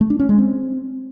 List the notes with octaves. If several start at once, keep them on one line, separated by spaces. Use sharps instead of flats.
A3
D4
C#4
G#3
C4